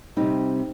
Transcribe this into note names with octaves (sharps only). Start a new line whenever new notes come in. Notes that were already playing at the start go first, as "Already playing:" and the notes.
C3 G3 C4 D#4